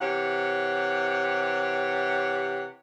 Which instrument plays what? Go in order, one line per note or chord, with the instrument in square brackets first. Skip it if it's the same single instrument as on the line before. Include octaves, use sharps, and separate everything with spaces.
[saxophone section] C3 E3 G4 C#5 F#5